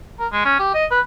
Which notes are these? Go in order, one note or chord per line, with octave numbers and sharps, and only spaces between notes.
A#4
G#3
C#4
G4
D#5
B4